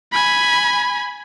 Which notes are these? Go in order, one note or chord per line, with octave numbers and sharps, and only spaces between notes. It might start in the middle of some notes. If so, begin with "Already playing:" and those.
G#5 B5